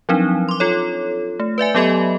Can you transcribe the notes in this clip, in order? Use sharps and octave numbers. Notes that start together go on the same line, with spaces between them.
F3 F#3 C4 D4 D#4
C6 D6
F4 A4 C#5
A3
B4 D5 E5 G#5
F#3 B3 G4 A4 D#5 B5